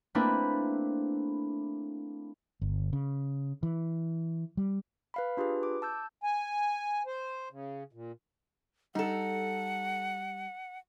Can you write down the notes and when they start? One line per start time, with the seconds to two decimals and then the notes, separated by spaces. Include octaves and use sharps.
0.15 A3 A#3 C4 D4 E4 B4
2.62 G1
2.93 C#3
3.63 E3
4.57 G3
5.14 B4 F5 B5
5.37 D4 F4 G4 G#4 B4
5.63 D6
5.82 A5 E6 G6
6.23 G#5
7.06 C5
7.51 C#3
7.93 A#2
8.95 G3 D#4 A4 F#5